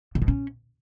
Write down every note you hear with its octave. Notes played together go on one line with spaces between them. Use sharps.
C#3
B2
C#4